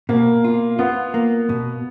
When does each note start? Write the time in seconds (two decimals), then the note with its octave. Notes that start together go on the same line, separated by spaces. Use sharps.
0.09 B2 A#3
0.45 F4
0.79 B3 F4
1.14 A#3
1.49 B2